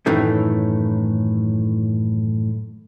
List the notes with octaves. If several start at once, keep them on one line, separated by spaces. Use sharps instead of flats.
F#2 A2 D#3 E3 A3 C#4